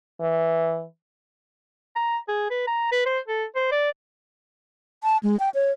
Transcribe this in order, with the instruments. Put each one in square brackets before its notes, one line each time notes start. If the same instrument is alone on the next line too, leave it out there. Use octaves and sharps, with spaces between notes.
[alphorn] E3
[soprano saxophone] A#5
G#4
B4
A#5
B4
C5
A4
C5
D5
[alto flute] A5
G#3
G5
C#5